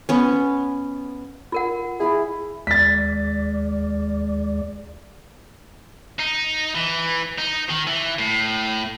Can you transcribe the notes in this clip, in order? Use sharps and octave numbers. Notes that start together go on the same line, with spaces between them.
B3 C#4
F4 A#4 F#5
E4 G#4 B5
D#2 G#3 D5 A6 B6
D#4
E3
D#4
D#3
E3
A2